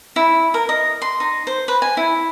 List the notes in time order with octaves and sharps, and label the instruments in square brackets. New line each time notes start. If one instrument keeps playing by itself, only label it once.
[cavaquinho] E4
A#4
D#5
C6
D#4
C5
B4
G#5
E4